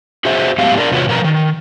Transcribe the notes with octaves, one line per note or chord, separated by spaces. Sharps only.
F#4 G#4 C5 E5
A2 F#3 G#3 B3 G4 F5
D4 A#4 D5
E2 C3 F4 F#4 B4 C#5
B2 F3 A#4 B4 A#5
D#3